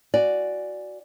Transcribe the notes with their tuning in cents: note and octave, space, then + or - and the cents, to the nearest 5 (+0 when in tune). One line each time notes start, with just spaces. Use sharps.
F#4 +0 D5 +0 G#5 +0